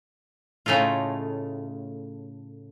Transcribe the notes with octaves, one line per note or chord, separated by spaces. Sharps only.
A2 C#3 A3 D#4 F4